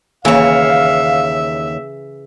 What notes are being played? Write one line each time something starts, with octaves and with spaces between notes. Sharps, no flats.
D#2 C#3 E3 C#5 E5 F5